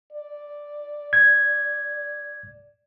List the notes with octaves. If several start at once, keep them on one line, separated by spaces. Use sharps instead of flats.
D5
G#6